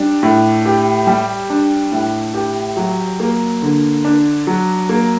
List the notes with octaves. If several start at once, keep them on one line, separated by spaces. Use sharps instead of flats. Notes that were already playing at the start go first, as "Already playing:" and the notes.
Already playing: G3 D4
A2
G4
G3
D4
A2
G4
F#3
A#3
D3
D4
F#3
A#3